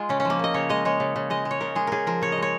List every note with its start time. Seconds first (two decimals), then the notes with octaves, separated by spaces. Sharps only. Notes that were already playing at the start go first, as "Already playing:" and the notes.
Already playing: G#3 F4 G#4
0.09 C#3 C#4
0.20 C#4
0.25 F3
0.30 A#3
0.39 C#3 D#5
0.54 C#3 C#5
0.69 G#3 D#5
0.85 G#3 C#5
1.00 C#3
1.16 C#3
1.30 G#3 D#5
1.45 G#3
1.51 C#5
1.60 C#3 A#4
1.75 G#3 G#4
1.87 C#3 G#4 A#4
2.07 F3 A#4
2.21 C#3 C#5
2.32 D#5
2.38 G#3 C#5